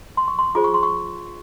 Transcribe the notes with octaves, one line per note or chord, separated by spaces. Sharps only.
C6
C#6
C6
F4 G#4 C5 D6
C#6
C6
C#6